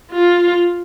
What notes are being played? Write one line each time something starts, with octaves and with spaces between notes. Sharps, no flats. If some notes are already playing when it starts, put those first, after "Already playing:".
F4